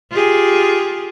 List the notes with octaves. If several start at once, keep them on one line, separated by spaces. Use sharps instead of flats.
F4 G4 G#4